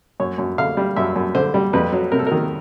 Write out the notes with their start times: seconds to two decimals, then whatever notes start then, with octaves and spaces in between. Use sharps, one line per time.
0.20 F#2 C#5
0.38 F#2
0.58 D3 F5
0.77 G3
0.96 F#2 E5
1.16 F#2
1.35 D3 C5
1.54 G3
1.73 F2 B4
1.92 F#3
2.12 C3 A#4
2.19 A4
2.27 D#3 A#4